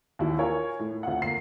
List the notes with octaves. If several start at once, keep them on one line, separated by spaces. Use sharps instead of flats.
D#2 A#2 E4 F#4
F4 A#4 C#5 G#5
A2
D2 F4 F#5
A#3 C7